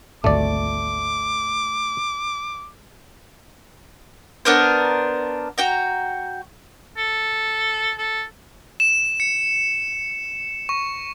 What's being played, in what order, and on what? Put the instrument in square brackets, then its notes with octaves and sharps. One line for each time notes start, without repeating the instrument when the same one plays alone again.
[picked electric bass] G#1 D2 [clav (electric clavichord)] A3 D5 [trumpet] D6
[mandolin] B3 D4 A#4 C5
F#4 G5 A#5
[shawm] A4
A4
[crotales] E7
C#7
C#6